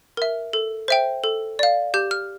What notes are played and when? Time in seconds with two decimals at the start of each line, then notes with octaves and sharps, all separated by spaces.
0.17 A#4 E5
0.53 A4
0.88 C5 E5 G5
1.24 A4
1.59 D5 F5
1.94 G4 G6
2.11 F6